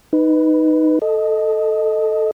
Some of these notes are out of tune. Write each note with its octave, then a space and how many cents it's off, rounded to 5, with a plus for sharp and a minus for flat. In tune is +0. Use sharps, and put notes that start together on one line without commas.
D#4 +0 B4 +5
A4 +0 D#5 +0